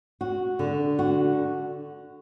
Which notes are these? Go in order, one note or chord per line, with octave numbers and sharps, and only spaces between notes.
F#4
D3
F#4